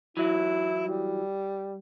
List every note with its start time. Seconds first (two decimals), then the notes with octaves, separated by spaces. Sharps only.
0.17 E3 F#3 E4
0.88 G3